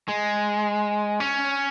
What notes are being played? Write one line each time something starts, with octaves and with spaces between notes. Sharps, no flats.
G#3
C#4